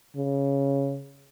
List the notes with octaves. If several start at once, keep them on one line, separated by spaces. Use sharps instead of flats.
C#3